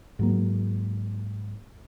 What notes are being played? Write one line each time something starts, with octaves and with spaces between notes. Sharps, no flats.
G#2 F#3 A#3